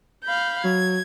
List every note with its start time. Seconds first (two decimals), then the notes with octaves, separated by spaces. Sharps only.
0.25 F5 B5 G6
0.64 F#3 G#6